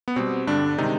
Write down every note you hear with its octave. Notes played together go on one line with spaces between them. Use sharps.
B3
B2 G3 C4
G2 D3 G3 D4
C3 D#3 G#3 D#4